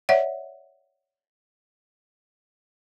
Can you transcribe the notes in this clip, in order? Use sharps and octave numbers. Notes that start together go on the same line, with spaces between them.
C#5 D5 E5 F#5